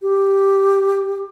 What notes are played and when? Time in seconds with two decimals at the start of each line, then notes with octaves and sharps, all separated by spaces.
0.02 G4